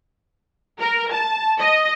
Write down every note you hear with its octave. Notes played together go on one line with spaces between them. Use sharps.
A#4
A5
D#5